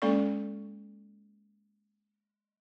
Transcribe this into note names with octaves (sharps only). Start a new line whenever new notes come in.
G#3 A#3 C#4 A4 D5 C#6